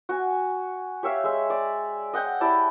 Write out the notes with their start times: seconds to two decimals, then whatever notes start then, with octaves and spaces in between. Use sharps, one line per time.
0.09 F#4 G#5
1.03 G4 C#5 E5 F5
1.24 G#3 E5
1.50 D5
2.14 D#5 F#5 G5
2.41 E4 G4 D5 A5